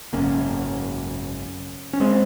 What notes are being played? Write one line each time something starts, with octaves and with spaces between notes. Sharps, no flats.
G#1 F#2 C#3 A#3 C#4
C#4
G#3 C4